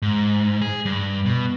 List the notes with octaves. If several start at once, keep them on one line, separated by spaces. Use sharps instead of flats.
G#2
G#4
G2
B2